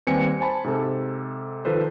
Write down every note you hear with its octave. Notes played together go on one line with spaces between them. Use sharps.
D#2 G3 C4 B4 G#5 C#7
C5 G#5 A5 B5
G#2 C3 A4
D#3 F3 A4 B4 C5